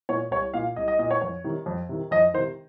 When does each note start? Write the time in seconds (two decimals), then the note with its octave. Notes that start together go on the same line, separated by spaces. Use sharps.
0.09 A#2 C#5
0.31 C2 C#5
0.54 A#2 F5
0.76 C2 D#5
0.88 D#5
0.99 A#2 D#5
1.11 C#5
1.21 F2 C#5
1.44 C3 D#3
1.66 F2
1.89 C3 D#3
2.11 F2 D#5
2.34 D#3 C5
2.38 C3